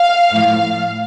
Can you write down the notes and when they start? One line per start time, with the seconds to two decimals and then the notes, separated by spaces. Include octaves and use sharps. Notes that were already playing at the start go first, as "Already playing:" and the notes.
Already playing: F5
0.32 A2 F3 F5